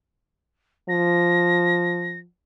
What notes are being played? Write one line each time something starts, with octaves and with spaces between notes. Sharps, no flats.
F3 A#6